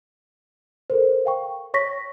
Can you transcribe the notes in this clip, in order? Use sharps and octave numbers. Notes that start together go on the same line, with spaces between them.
A4 A#4 C5
F5 G5 C#6
C#5 C#6 A#6 B6